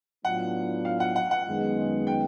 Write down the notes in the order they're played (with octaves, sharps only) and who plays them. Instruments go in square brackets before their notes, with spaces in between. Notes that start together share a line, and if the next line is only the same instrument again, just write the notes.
[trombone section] A2 F#3 B3 D4 F4 [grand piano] F#5
[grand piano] F5
F#5
F#5
F#5
[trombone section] F#2 D#3 G#3 B3
[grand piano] G5